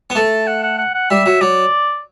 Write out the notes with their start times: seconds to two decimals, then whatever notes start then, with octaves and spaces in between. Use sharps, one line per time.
0.10 B3
0.15 A3 A5
0.47 F#5
0.63 F#5
0.78 F#5
0.94 F#5
1.11 G3 E5
1.26 F#3
1.41 F#3 D5